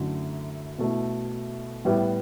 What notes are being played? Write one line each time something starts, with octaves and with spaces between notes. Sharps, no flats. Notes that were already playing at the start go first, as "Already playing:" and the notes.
Already playing: F#2 D3 A3 E4
B2 A3 E4
A2 G3 B3 E4